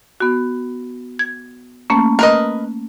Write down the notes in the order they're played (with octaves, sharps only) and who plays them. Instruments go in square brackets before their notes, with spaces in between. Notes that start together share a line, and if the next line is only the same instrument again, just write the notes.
[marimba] B3 F#4
G#6
A3 A#3 C#4
[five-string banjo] A#4 B4 D#5